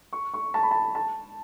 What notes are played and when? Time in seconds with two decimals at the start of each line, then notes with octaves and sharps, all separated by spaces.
0.13 C#6
0.34 C#6
0.54 A5
0.63 B5
0.71 A5
0.95 A5